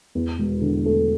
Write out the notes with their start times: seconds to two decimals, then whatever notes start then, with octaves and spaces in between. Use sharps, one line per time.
0.15 E2
0.38 E1
0.61 D3
0.85 A3